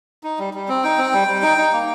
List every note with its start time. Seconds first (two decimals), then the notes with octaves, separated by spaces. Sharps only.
0.23 D#4
0.39 G3
0.54 G3
0.68 C4
0.83 D#4 G5
0.98 C4
1.13 G3
1.28 G3
1.43 D#4
1.58 D#4
1.73 A#3